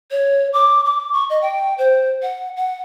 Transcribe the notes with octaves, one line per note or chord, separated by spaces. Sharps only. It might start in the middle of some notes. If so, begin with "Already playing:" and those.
C#5
D6
D6
C#6
D#5
G5
C5
F#5
F#5